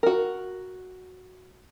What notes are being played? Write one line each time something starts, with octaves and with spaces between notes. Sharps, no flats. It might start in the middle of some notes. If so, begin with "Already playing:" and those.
F#4 A#4